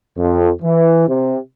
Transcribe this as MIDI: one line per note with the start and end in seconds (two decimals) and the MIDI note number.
0.17 0.50 41
0.62 1.06 52
1.07 1.38 48